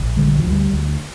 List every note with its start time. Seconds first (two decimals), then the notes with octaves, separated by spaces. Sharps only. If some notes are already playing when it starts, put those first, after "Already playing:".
Already playing: A#1
0.16 D3 G#3
0.27 G3
0.39 F3
0.44 D2
0.50 G3
0.70 D2